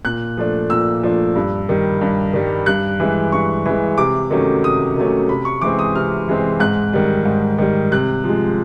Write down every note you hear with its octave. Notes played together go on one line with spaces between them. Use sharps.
A#2 F#6
F3 A3 D4
A#2 E6
F3 A3 D4
G2
D#3 G3
G2
D#3 G3
G2 F#6
E3 G#3
G2 C#6
E3 G#3
C3 D6
D#3 F#3 A3 C#4
C3 D#6
D#3 F#3 A3 C#4
C3 B5
C#6
E3 G#3 C4 D6
D#6
C3 F6
E3 G#3 C4
G#2 F#6
D#3 G3
G#2
D#3 G3
C3 F#6
F3
G#3